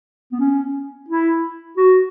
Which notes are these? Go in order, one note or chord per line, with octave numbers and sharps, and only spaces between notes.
B3
C#4
E4
F#4